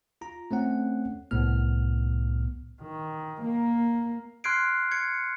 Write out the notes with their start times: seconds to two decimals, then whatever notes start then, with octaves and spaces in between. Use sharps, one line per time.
0.21 F4 A#5
0.51 A3 C4 C#4 F#5
1.31 C2 A2 B3 F6
2.82 D#3
3.41 A#3
4.44 C6 F6 F#6 G#6 C7 D7
4.91 G#6 C#7